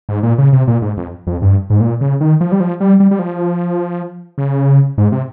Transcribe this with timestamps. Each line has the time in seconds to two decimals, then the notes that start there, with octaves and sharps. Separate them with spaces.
0.09 G#2
0.23 A#2
0.38 C#3
0.53 C3
0.67 A#2
0.82 G#2
0.97 F2
1.27 F2
1.42 G2
1.70 G#2
1.81 A#2
2.01 C#3
2.21 D#3
2.41 F3
2.52 G3
2.60 F3
2.80 G3
3.00 G3
3.11 G3
3.19 F3
4.38 C#3
4.98 G#2
5.12 C3